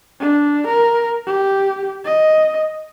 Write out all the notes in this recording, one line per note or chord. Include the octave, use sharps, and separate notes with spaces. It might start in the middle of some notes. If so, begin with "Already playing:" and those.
D4
A#4
G4
D#5